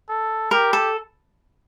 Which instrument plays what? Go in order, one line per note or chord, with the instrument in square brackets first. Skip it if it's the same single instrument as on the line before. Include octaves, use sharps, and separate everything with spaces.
[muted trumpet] A4
[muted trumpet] G4 [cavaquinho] A#4
[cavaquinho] A4